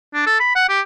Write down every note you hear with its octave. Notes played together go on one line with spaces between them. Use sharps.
D4
A4
B5
F#5
G4